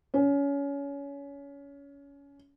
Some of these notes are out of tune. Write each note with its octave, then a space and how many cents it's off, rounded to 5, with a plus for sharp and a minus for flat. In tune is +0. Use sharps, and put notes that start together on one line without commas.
C#4 +25